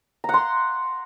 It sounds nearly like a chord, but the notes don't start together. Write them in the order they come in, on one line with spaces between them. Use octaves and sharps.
A#5 F#5 C6